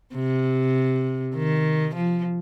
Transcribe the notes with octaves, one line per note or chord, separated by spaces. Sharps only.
C3
D#3
F3